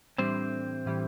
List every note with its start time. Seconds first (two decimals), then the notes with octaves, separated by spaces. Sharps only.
0.18 A2 E3 G3 C4 D4 G4 C5
0.86 A2 E3 G3 D4 G4